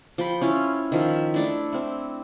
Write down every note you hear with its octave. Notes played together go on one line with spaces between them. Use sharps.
F3 G5 B5
C#4 E4 F4
D#3 F3 E5
A3 D4 E4
C4 E4